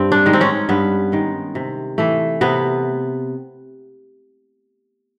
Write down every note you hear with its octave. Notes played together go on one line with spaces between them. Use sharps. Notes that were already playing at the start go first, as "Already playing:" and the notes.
Already playing: G2 C4
D4
D#3 G#3
C4
C#4
G2 B3
D#3 G#3
C3
E3 A3
C3 B3